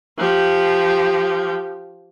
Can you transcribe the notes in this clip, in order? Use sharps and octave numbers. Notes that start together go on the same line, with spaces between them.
F3 G4